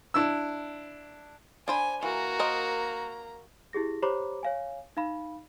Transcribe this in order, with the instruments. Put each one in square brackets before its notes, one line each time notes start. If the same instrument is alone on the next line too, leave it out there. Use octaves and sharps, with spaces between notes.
[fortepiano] D4 E4 E6
[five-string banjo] D4 C5 B5 [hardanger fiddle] G#5
[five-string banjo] E3 [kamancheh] A#3 A#5 [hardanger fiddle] F#4
[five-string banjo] A#4 C5 D#5
[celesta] E4 G4 G#4 A#6
G4 C5 C#5 A#5 B5 D6
C#5 F5 G#5
D#4 F5 B5